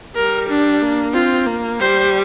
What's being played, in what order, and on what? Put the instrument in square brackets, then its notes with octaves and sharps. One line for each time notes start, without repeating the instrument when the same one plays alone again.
[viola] G3 [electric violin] A#4
[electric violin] D4
[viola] A#3
[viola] C4 [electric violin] F4
[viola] A#3
[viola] G3 [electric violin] C5